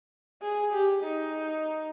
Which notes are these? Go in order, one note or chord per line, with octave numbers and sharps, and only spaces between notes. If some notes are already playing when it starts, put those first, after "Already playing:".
G#4
G4
D#4